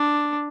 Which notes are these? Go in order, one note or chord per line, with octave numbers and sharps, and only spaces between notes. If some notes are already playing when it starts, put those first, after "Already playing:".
Already playing: D4